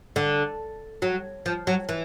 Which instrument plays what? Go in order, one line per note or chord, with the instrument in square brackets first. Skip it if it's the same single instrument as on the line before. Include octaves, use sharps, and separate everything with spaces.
[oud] D3
F#3
F3
F#3
E3